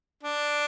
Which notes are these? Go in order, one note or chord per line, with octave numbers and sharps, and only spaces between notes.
D4